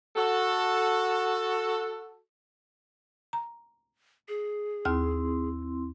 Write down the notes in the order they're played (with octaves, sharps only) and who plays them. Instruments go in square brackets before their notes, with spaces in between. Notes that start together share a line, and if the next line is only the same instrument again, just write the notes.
[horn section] F#4 A4
[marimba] A#5
[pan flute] G#4
[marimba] D#2 F6 [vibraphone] C4 E4 C6